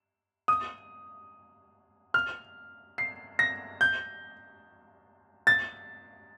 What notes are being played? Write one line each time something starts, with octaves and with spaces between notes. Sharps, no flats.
D#6
F6
C7
A#6
G6
A6